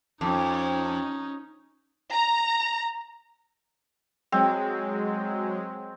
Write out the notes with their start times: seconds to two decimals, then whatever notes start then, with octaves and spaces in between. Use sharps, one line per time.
0.21 F2 C#4 D#4
2.13 A#5
4.32 F#3 G#3 C4